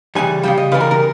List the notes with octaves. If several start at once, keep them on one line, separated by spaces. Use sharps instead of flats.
C#3 E3 G3 G#5
C#3 E3 G3 G5
D#5
C#3 E3 G3 B4
A#4
A#4